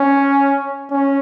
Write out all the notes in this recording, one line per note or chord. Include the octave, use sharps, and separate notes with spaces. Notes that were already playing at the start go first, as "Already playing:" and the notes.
Already playing: C#4
C#4